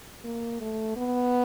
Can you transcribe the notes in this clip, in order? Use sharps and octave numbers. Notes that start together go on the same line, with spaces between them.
A#3
A3
B3